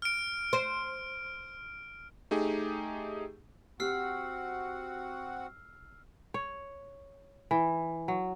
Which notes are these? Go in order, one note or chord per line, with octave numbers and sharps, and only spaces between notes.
F6 D7
C5
A3 D#4 G4 G#4
C4 F#4 G4 F#5 E6 F6 C7
C#5
E3
F#3